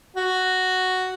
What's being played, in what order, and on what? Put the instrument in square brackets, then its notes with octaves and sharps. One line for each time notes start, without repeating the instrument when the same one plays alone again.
[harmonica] F#4